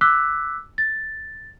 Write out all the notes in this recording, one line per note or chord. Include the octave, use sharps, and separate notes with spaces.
D6 E6 F#6 B6
A6